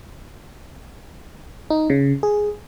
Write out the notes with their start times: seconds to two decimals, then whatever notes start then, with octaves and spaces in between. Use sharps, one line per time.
1.70 D#4
1.90 C#3
2.23 G#4